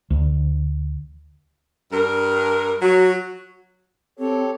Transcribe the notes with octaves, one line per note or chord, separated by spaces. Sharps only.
D2
G2 A#4
F#3 F#4
C4 G4 A4 C#5